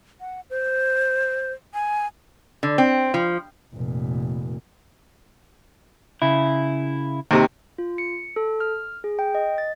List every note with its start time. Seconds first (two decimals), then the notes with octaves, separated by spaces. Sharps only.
0.20 F#5
0.50 C5
1.74 G#5
2.63 D3
2.78 C4
3.14 F3
3.74 F1 A#2
6.22 C#3 E4
7.31 D#2 C3
7.78 F4
7.98 C#7
8.36 A4
8.60 F6
9.04 G#4
9.19 G5
9.35 D#5
9.58 A6